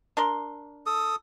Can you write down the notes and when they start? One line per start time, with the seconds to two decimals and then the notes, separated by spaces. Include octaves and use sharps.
0.17 D4 A#4 C6
0.86 A4 D#6